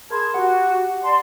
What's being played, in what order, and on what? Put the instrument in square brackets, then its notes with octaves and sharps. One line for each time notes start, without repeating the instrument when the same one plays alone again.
[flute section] G#4 A5 G#6 [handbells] A#4 B5 C6
[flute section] F#4 [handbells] G4 F#5
[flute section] D5 A5 C6